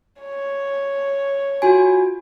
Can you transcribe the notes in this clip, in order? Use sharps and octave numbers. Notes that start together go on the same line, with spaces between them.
C#5
F4 F#4 G#5